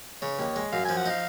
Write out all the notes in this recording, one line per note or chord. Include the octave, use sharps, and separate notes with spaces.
C#3 C#5
D#2
G#3
F#2 F5
F3 G#5
F#5
D#4 F5